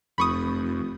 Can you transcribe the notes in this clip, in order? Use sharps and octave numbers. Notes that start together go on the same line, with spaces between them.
F1 F2 B5 C#6 D#6